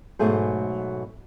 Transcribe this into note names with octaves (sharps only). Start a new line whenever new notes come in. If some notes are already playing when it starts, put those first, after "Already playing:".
G#2 B2 F#3 A3 G#4 C5